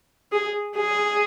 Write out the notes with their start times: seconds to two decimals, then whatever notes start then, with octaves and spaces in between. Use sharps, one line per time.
0.32 G#4
0.77 G#4